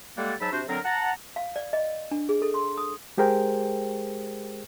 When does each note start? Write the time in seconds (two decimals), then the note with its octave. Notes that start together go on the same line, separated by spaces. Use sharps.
0.17 G3 G#3 A#3 A4 D5 F#5
0.41 G#2 F#3 D#4 A5 B5 E6
0.52 C3 D4 F#4 C5
0.68 D3 F#3 C4 A4 A#4
0.85 F#5 A5 A#5
1.36 F5
1.56 D5
1.73 D#5
2.11 D4
2.29 G#4
2.42 A4
2.54 C6
2.78 D#6
3.17 G#3 G4 G#4 A#4 C5 G5